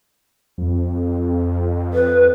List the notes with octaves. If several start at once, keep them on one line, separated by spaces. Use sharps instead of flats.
F2
B4